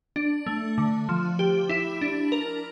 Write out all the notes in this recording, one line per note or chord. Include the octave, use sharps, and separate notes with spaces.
D4
A3
D3
F3
G4
E4
D4
A#4